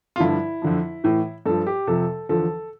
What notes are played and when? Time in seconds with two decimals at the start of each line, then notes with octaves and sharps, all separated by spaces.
0.16 F4
0.20 G2 D3 F3 E4
0.62 F2 D3 F3
1.04 A2 E3
1.46 G2 F3 A4
1.67 G4
1.87 F2 C3 F3 A4
2.29 E2 D3 F3 A4